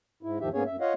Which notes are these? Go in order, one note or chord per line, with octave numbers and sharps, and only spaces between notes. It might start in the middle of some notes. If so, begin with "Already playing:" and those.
G#2 E4
E2 G#2 D#3 F3 G4 E5
G#2 A#3 B3 C#4 G#4 C#5
F#2 E5
F4 C#5 D#5 F5 F#5